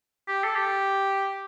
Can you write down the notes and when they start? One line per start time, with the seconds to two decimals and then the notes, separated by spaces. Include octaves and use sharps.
0.28 G4
0.44 A4
0.56 G4